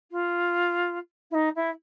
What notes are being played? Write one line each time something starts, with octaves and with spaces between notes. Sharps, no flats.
F4
E4
D#4
E4